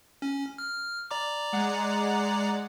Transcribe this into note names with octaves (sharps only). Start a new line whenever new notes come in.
C#4
F6
D5 A#5 D6
G#3 F#5